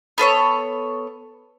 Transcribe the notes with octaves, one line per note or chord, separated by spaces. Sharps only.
B3 A4 C5 C#5